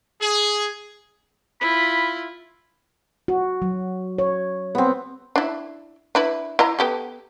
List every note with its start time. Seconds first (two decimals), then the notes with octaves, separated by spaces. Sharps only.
0.21 G#4
1.61 E4 F4 B5
3.28 F#4
3.62 F#3
4.18 C#5
4.75 B3 C4
5.36 D4 E4
6.15 D4 E4 B4
6.59 E4 D#5 A#5
6.79 B3 G4 A4